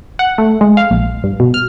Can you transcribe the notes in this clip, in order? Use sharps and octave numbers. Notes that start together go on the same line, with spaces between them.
F#5
A3
G#3
F5
A#1
G2
B2
F6